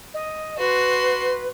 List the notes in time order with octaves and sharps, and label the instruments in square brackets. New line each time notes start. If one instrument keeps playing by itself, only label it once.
[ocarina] D#5
[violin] F#4 C6 [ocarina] B4